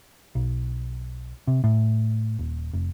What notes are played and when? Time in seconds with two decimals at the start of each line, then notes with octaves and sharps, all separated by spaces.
0.35 B1
1.47 C3
1.64 A2
2.39 D#1
2.74 F1